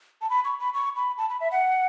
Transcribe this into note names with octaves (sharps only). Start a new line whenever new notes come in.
A5
B5
C#6
B5
C#6
B5
A5
B5
E5
F#5